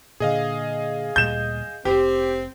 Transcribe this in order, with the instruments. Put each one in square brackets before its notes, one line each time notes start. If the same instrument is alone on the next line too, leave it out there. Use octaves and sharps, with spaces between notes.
[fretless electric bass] A#2 D3 [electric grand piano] G#4 D#5 F5
[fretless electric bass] D2 A#2 G3 [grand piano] G6 E7
[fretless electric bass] F1 [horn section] C4 [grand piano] G4